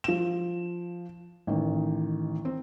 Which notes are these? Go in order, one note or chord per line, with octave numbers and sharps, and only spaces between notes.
F3 E7
A1 D#3
C4